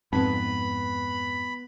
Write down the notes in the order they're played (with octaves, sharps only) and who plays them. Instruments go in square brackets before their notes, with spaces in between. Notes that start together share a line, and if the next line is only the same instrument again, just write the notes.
[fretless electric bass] F2 G#2 [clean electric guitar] B3 B4 [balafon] C4 [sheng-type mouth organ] B5